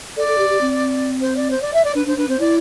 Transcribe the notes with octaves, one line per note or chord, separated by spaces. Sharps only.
A4 D5
A4
G4
G4
C4
C5
D5
C5
D5
E5
D5
D4 B4
D4 C5
D4 B4
C4 C5
E4 D5